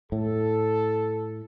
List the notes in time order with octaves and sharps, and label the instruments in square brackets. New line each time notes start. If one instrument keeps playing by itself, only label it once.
[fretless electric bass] A2 [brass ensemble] A4